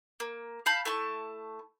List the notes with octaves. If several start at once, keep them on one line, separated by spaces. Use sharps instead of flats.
A#3
F5 A5 B5 G6
A3 E4 A5 C#6